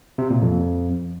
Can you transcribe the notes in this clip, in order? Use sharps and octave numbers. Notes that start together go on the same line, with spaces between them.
C3
A#2
F2